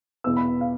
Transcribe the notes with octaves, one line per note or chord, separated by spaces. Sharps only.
E2 B2 B3 E6
B5
F5